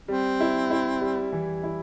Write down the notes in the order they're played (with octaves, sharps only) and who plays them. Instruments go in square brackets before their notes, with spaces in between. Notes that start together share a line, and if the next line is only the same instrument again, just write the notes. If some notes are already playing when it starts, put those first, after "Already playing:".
[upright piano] G3 [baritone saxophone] C4
[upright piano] E4
E4
G3
E3
E4